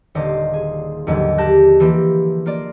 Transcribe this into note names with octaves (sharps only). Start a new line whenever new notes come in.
D#1 D3 C5 D#5 F5 D6
G#4
D#2 G#2 D3 F3 F#3
G4 A5 F#6 A#6
E3 F3 A#3 G4
A#3 F4 D5